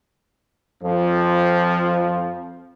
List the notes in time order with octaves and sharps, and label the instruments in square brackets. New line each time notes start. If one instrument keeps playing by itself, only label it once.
[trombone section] F2 F3